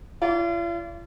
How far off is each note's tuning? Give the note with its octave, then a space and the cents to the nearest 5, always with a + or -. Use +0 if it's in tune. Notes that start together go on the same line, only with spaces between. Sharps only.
F4 -45 D5 -35